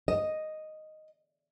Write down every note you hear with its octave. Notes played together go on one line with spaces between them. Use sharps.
D#5